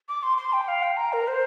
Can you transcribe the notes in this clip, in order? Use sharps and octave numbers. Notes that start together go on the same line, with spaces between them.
D6
C6
C6
G5
F5
G5
A#5
A#4
C5